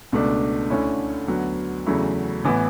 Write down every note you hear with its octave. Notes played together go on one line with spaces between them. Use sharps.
C#2 B2 A3 D4
D2 D3 A3 C#4 E4
D2 D3 F#3 B3
E2 C#3 F#3 A3 E4
A1 A2 E3 B3